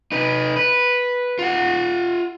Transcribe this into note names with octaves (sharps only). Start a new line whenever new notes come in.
D#4 B4
B4
F4 F#5